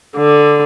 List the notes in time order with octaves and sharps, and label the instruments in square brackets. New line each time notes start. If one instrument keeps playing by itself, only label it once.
[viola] D3